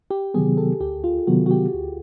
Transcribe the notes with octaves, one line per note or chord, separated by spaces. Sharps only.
G4
C3 D#3 F#3 B3 G#4
A4
D2 G4
F4
C3 D#3 F#3 B3 F#4
F#4
G4
D2